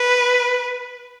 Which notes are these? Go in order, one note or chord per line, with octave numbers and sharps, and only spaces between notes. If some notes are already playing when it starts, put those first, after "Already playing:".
Already playing: B4